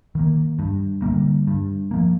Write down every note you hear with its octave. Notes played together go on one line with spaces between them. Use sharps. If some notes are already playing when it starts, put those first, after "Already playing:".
D#3 A#3
G2
D3 G3 A#3
G2
F3 A#3